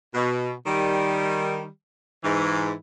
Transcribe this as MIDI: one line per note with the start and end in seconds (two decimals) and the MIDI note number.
0.14 0.52 47
0.66 1.66 51
0.66 1.66 55
2.23 2.72 44
2.23 2.72 52